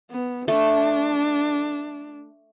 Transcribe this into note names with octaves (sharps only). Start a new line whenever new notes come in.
B3
A3 D4